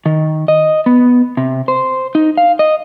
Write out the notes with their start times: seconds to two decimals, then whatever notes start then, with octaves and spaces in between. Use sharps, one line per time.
0.06 D#3
0.48 D#5
0.86 B3
1.37 C3
1.68 C5
2.15 D#4
2.37 F5
2.59 D#5